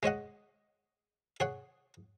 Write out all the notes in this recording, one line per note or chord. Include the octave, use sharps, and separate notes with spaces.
G#3 C#5 D#5 F#5
G#4 C#5 F#5